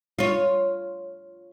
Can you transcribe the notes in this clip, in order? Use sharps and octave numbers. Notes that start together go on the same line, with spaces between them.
F4 C#5